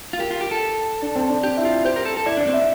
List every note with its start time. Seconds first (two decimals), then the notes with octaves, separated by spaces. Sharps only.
0.13 F4
0.19 G4 A#4
0.31 F4
0.41 G4
0.51 A4
1.02 D4
1.16 C4
1.29 D4
1.43 G4
1.57 E4
1.65 F4
1.85 G4 C5
1.96 A#4
2.05 A4
2.17 A4
2.26 E4 D5
2.37 D4 D5
2.47 C4
2.54 E5